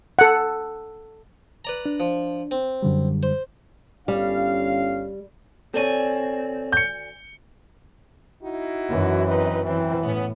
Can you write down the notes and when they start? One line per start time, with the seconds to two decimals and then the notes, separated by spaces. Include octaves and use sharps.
0.19 A4 F#5
1.65 B4 D5 A#5
1.86 D4
2.00 F3
2.51 C4
2.82 F#2 D3 G3
3.23 C5
4.08 G1 G3 C#4 F5
5.74 D2 C4 A4 C#5 D5 G#5
6.72 G6 C#7
8.42 D#4 E4 F#4
8.89 F#2 E3
9.25 C4 D#4 B4
9.65 E3 F#3 C4
10.03 A2 B3 C#4